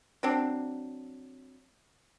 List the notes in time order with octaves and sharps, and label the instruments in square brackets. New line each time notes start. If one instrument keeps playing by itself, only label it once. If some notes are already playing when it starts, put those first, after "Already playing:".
[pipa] F#3 C4 D4